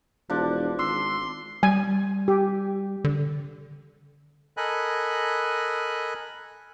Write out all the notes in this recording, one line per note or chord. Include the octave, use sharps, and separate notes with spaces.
E1 F3 D4
G#1 C6 E6
G3 G#5
G4
D3
A4 A#4 D#5 G#5 B5 F#6